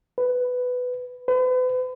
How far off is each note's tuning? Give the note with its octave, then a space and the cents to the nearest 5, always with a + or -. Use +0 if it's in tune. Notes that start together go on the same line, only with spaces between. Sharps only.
B4 +10
B4 +40